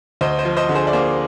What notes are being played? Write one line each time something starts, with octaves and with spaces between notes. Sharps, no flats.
D2 C5 D#5
C5 D#5
F3
C5 D#5
D3
G#4 C5
D5
A#3 G#4 C5